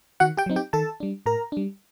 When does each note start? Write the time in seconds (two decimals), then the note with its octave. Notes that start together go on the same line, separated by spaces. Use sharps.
0.20 D#3 F#4 F#5
0.37 G4 G5
0.46 F#3 C4 D#4
0.56 G4 G5
0.73 D#3 A4 A5
1.00 G3 D4
1.26 A2 A#4 A#5
1.52 G3 D4